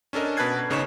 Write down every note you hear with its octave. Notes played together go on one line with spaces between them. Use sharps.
C#4 D4 A4 A#4 D#5
B2 B4 A5 F#6 G#6 C7
G#1 C#3 D#4 C#5 C#6 E7